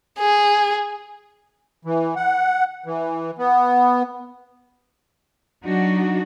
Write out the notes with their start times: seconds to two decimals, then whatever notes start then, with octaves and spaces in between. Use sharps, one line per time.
0.19 G#4
1.85 E3
2.16 F#5
2.86 E3
3.38 B3
5.65 F#3 D4 D#4 F#4